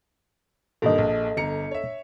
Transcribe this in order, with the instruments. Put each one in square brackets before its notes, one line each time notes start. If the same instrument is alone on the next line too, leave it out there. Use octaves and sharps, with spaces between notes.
[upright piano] G2 A#2 D#3 [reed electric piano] A4 D#5
[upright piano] A#1
G1 A#5 C#7
C#5 E5